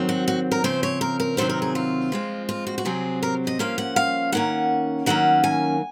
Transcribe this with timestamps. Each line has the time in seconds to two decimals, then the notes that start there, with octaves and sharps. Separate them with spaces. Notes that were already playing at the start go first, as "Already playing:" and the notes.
Already playing: D#3 F#3 C4
0.09 F#4
0.28 F#4
0.51 A#4
0.64 C#3 F3 C4 C5
0.83 C#5
1.01 A#4
1.20 A#4
1.37 C3 D#3 F#3 C4 C5
1.49 A#4
1.62 G#4
1.75 F4
2.12 F3 G#3 C4
2.49 F4
2.67 F#4
2.78 F#4
2.85 C3 F#3 C4 G#4
3.23 A#4
3.47 D#5
3.59 F3 A#3 C#4 F5
3.78 F#5
3.96 F5
4.32 D#3 A#3 C#4 F#5
5.06 D#3 F#3 A#3 C#4 F#5
5.44 G#5